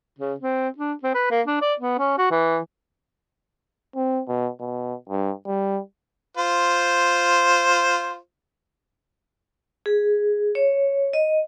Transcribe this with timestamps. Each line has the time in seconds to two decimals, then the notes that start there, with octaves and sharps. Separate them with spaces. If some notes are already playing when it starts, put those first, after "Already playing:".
0.19 C#3
0.40 C4
0.78 D4
1.03 C4
1.15 B4
1.31 A#3
1.47 D4
1.62 D5
1.80 B3
1.99 C#4
2.18 F#4
2.31 E3
3.95 C4
4.28 B2
4.60 B2
5.09 G2
5.47 G3
6.37 F4 C5
9.86 G#4
10.55 C#5
11.13 D#5